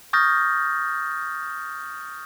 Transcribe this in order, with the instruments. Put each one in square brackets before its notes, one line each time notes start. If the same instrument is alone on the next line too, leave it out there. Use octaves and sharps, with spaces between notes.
[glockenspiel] C#6 D#6 F6 G6 A6 A#6